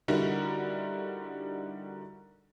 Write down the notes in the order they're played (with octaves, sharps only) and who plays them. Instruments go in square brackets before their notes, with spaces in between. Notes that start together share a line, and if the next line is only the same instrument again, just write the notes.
[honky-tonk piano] D3 G3 D#4 E4 F#4 A#4